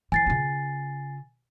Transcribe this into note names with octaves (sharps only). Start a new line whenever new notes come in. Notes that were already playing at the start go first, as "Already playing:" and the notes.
E3 G#5 A6 C7
C#3 F4